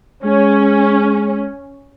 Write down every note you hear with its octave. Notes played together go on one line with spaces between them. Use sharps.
G#3 C#4